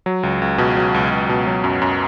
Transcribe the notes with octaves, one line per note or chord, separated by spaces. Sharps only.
F#3
C#2
C#2
B2
F#3
C#2
C#2
B2
F#3
F#2
F#2